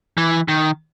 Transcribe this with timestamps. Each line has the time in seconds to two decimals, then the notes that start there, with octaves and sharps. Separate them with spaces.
0.17 E3
0.48 D#3